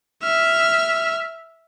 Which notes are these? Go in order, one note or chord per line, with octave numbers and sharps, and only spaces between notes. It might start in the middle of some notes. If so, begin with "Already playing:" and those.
E5 F6